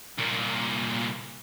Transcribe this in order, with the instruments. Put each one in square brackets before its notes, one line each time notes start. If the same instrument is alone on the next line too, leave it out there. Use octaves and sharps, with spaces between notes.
[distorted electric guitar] C2 A#2